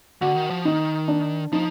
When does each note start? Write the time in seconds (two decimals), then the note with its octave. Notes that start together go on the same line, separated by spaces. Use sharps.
0.21 D3 F#4
0.36 D#3
0.50 F3
0.65 D#3 D#4
1.08 D4
1.52 F3 D#4